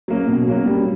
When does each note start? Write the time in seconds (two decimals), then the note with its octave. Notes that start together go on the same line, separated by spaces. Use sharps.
0.08 F#3 A#3 C#4
0.27 B2
0.47 F#3 A#3 C#4
0.66 G3